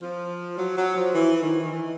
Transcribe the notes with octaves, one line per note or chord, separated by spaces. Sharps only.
F3
F#3
F#3
F3
E3
D#3
D#3
E3